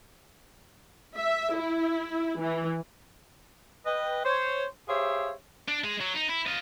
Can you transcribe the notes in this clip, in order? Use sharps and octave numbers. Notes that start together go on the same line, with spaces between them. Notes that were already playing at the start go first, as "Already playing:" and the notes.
E5
E4
E3
B4 D#5 G5
C5 C#5
G4 G#4 C5 C#5 E5 F5
D4
G#3 G#4
F#3
D#4
E4
F4 D#5